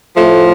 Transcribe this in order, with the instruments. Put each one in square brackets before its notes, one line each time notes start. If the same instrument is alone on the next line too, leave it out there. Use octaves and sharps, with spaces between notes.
[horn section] A2 F3 A3